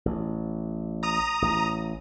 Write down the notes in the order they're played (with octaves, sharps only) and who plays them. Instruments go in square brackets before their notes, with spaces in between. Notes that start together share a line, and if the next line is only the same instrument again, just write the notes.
[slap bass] A1
[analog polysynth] A#5 D#6
[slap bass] A1